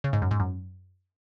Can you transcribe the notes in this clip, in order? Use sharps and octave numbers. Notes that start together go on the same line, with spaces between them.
C#3
G#2
F#2
G#2
F#2